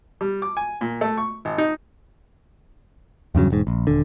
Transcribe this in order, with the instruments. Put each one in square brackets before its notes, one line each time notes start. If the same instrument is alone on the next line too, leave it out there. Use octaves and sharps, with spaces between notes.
[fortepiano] G3
D6
G#5
A#2
A3
C#6
G#1
D#4
[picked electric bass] E2 G2 C#3 F#3
E1 G#2
A#1
D#1 D3